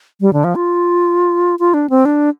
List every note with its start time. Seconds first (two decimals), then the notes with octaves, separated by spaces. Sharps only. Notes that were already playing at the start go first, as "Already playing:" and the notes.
0.21 G3
0.33 D3
0.44 F3
0.55 F4
1.59 F4
1.74 D4
1.90 C4
2.05 D4